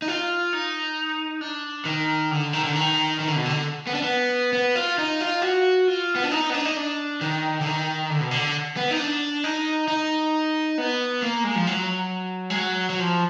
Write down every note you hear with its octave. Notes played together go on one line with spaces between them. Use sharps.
D#4
F4
D#4
D4
D#3
D3
D#3
D3
D#3
D#3
D3
B2
D3
B3
D4
B3
B3
F4
D#4
F4
F#4
F4
B3
D4
D#4
B3
D4
D#4
D4
D#3
D3
D#3
D3
B2
D3
B3
D#4
D4
D#4
D#4
B3
A#3
G#3
F3
F#3
G#3
F#3
F#3
F3